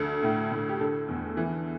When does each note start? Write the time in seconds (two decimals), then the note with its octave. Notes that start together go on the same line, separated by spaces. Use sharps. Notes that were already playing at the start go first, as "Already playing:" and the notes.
Already playing: D2 A4
0.23 A2
0.52 A2
0.69 G4
0.80 D3 A4
1.08 E2
1.37 E3